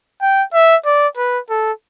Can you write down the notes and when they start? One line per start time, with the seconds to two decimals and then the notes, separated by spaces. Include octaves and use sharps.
0.21 G5
0.53 E5
0.85 D5
1.17 B4
1.49 A4